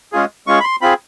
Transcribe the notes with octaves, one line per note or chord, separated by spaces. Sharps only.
G#3 C#4 F4 G#4
G#3 C#4 F4 G#4 C#6
B5
C6
C4 F4 G#4 B5